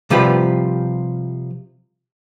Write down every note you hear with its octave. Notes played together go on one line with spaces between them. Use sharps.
C3 F3 G3 F4 G4 B4